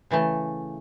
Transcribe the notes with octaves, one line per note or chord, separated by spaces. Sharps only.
C#3 E3 A3